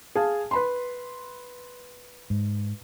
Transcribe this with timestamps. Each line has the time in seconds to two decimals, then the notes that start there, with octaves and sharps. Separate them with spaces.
0.15 G#4 F5 A5
0.51 B4 B5 C6
2.30 G#2